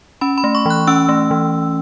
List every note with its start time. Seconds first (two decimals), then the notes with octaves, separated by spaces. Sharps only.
0.21 C#4 B5
0.38 B5
0.44 A3
0.55 C#6
0.66 E3 F#6
0.87 C#4 E6
1.09 A3
1.31 E3